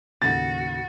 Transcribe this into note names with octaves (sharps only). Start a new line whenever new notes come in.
D#2 A2 C#3 F#4 A6